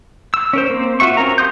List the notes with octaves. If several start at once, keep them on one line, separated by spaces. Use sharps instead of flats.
E6
C#4 A#4 C5
A#3 C4
F4 F#4 E5 C#6
C4 C#4 A#4 A#5
G4 F5 C6 D#6 G6